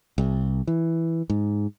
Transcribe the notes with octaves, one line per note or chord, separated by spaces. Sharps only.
C2
E3
G#2